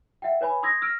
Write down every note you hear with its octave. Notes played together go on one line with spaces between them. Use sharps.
E5 F#5 G5
B4 C#5 G#5 B5
C6 D#6 E6 G#6 A#6
E6 F6 A#6 D7